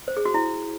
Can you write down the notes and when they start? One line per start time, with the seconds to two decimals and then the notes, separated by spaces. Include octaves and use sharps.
0.08 C5
0.17 G#4
0.25 F#4
0.34 E4